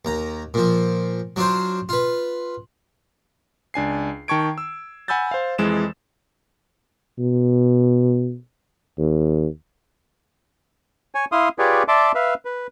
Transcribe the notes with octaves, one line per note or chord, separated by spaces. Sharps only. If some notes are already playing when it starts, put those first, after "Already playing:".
D#2 A#5
A#2 F3
F#3 D4 F4 C5
F4 B4
C#2 D4 G#5 C7
D#3 G5 A5 C#6 G#6 D7
E6
F#5 G#5 B5 E6 G6 A6
C5 F5
F2 E3 G#3 E7
B2
D#2
C#5 G#5
E4 F5 C6 D#6
F4 G4 G#4 B4 C#5 D5
D5 E5 A5 C6 D6
B4 E5 F5
B4